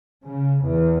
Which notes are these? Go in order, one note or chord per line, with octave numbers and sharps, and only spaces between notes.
C#3
E2